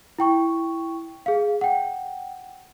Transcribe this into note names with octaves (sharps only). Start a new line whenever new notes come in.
E4 G5 C#6
G#4 F5
F#5 G5